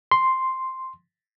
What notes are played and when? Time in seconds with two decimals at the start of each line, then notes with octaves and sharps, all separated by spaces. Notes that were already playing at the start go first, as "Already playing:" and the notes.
0.12 C6